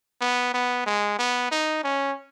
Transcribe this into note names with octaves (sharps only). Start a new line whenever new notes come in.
B3
B3
G#3
B3
D#4
C#4